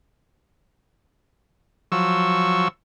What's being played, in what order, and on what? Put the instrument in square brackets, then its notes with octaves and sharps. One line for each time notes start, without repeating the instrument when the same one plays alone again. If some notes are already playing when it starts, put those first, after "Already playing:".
[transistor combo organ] F3 F#3 C#6 E6